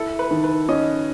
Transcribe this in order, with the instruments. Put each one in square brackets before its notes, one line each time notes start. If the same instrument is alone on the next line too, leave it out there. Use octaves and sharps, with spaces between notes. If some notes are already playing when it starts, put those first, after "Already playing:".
Already playing: [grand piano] E4 [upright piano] A4
[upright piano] B4
[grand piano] D#3
[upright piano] B4
[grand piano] C#4 [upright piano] D#5